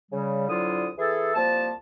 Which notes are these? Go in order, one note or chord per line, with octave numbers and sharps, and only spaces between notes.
C#3 G3
C2 D3 F#3 E4 F4 D#6
E3 G#4 A4
C2 F3 A#3 A5